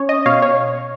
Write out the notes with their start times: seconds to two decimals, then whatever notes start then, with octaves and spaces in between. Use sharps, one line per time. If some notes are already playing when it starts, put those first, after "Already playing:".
Already playing: C#4 C#5
0.09 D#5
0.26 B2 C#5 F5
0.42 C#5